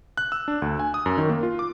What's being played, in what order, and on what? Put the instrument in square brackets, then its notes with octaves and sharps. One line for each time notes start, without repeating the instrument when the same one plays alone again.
[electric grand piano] F#6
E6
D4
D2
G#5
D#6
F#2
D#3
A#3
F4
D6